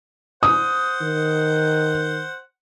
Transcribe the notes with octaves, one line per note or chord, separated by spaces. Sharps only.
C5 F#5 D#6
D#3